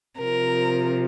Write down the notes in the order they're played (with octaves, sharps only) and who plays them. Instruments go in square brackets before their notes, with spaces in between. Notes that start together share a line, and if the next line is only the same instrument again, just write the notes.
[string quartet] C3 F3 A#4